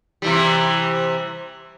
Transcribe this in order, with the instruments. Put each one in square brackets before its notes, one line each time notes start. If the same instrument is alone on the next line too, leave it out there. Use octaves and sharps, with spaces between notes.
[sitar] C3 E3 G3